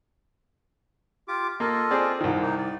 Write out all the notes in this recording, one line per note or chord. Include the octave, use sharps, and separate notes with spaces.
F4 G4 D6
A#3 F4 A4 D#5
C4 G#4 D5
C2 D#3
A#3 D#4
D5